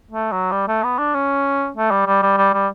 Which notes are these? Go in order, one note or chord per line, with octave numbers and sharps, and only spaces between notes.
A3
F#3
G3
A3
B3
D4
C#4
A3
G3
G3
G3
G3
G3